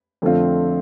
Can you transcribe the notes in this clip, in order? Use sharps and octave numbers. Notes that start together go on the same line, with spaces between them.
F2 D3 A3 C4 F4